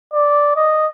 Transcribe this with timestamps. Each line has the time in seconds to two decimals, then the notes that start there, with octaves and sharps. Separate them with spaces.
0.13 D5
0.57 D#5